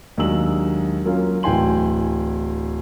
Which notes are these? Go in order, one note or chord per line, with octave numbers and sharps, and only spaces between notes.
D#2 F#3 G#3 D4 E6 F#7
F#3 A#3 C#4 F4
D1 E3 G5 G#5 C6 F#7